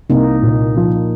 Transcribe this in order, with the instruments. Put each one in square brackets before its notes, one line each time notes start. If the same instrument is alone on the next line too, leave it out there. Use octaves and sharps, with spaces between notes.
[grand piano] C2 [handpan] A#3 D#4
[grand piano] A#2
F3